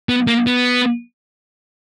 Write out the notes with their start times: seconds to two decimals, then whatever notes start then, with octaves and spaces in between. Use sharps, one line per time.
0.09 B3
0.27 A#3
0.47 B3